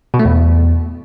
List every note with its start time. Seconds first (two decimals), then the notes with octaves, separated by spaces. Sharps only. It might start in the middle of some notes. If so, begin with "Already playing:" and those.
0.14 B2
0.19 A3
0.25 E2